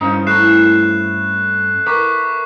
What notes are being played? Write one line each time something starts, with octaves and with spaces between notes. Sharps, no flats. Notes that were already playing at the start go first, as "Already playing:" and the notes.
G2 C#4 D#4 C5
A3 E4 F#6 C7 E7
A#4 B4 C#6 D6